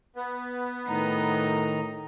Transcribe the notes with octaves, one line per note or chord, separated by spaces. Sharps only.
B3
A2 D#3 D#4 A#5